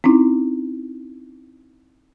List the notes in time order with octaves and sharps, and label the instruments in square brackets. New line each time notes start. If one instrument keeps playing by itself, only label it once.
[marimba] C4 C#4 D#4 E4